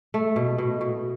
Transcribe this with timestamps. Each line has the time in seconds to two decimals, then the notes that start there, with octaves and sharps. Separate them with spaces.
0.14 A3
0.36 B2
0.58 B2
0.81 B2